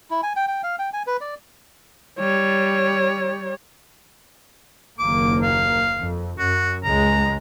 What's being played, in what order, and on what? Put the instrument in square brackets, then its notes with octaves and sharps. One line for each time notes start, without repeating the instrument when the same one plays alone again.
[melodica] E4
G#5
G5
G5
F5
G5
G#5
B4
D5
[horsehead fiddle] G3 C#5
[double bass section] F#1 D#2 A#3 [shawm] D6
[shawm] F5
[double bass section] F2
[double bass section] F#2 [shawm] F#4
[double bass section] C#2 C#3 G#3 [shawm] A#5